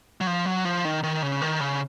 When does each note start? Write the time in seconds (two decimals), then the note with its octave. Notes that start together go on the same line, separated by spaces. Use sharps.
0.21 F#3
0.27 F3
0.46 F#3
0.65 F3
0.85 D#3
1.03 D#3
1.22 C#3
1.42 D#3
1.60 C#3